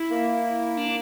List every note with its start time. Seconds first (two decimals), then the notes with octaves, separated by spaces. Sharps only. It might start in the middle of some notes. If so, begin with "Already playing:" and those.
Already playing: E4
0.10 A#3
0.77 D4